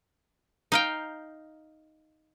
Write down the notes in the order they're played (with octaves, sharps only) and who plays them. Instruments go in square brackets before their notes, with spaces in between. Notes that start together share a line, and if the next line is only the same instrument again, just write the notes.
[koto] D#4 F5 G5